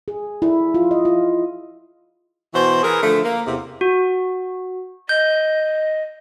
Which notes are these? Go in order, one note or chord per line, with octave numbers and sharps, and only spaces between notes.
G#4
E4
F4
D#5
F4
B2 E3 F#4 C5
E3 G#4 A#4
D3 F3 A3
A#3
E2 C3
F#4
D#5 G6